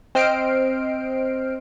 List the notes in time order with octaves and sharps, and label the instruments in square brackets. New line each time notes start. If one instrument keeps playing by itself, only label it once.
[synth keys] C4 C5 D#5 F6 C7 D7